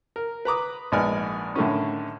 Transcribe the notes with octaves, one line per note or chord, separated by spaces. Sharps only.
A#4
B4 A#5 D6 D#6
A#1 G#2 B3 D5 G#5 F6
A2 D3 D#3 C#4